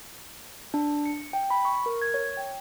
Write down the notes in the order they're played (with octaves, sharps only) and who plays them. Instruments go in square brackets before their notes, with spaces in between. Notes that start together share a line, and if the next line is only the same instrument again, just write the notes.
[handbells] D4
C#7
G5
B5
C#6
A#4
G#6
C#5
G5